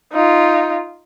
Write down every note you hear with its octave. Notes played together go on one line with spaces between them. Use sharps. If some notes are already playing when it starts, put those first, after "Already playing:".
D#4 F4